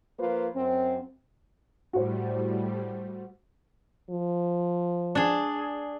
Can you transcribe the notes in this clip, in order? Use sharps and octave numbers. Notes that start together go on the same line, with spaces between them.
F3 A#3 F4 B4 C5
F#2 C4
A2 G3 F#4 C5
F3
D4 G#4